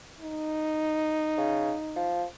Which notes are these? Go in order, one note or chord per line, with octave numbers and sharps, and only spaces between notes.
D#4
C#3
F3